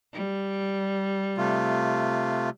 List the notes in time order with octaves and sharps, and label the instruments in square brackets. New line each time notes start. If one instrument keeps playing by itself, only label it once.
[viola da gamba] G3
[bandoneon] C3 A3 F4